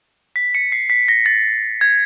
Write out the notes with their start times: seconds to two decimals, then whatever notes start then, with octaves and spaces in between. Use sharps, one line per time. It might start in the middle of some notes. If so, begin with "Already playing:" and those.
0.36 B6
0.55 C#7
0.72 C7
0.90 B6
1.08 A#6
1.26 A6
1.81 G#6